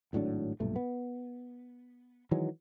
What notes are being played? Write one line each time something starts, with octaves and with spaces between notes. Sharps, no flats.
G#1 A2 F#3 D4
B1 G2 A#2 A3
B3
D#3 E3 F#3 G#3